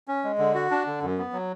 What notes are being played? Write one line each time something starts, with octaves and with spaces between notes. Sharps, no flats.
C#4
G#3
D3
F#4
D4
D3
F#2
B3
F#3